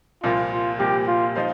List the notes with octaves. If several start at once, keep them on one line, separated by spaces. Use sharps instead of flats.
C2 A#2 F3 A#3 F4
F4
C2 A#2 F3 A#3 G4
F4
F3 D#4 C5 F5